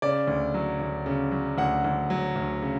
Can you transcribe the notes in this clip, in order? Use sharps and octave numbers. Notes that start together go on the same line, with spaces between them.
C#3 D5
D2
F#3
D2
C#3
F#3
D2 F#5
D2
F#3
D2
C#3